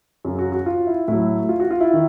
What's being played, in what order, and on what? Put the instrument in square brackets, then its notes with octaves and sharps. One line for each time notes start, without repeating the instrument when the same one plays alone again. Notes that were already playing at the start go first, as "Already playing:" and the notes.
[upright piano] F#2 C#3 F#3
F#4
F#4
F4
E4
A2 F#3 E4
F4
F#4
F4
E4
D#3